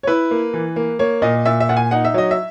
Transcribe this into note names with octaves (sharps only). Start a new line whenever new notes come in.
C#5
E4 B4
A#3
E3
A#3
A#3 C#5
A#2 D#5
A#2 E5
E5
A#2 F#5
G#5
D#4 F#5
E5
F#3 D#5
E5